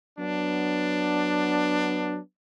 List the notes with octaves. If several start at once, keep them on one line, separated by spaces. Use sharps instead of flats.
F#3 B3 D4